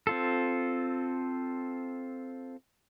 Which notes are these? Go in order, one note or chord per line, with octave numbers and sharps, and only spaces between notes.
C4 F4 A4